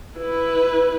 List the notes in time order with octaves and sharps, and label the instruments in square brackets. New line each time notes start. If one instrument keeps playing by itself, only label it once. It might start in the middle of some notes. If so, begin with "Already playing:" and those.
[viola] E4 B4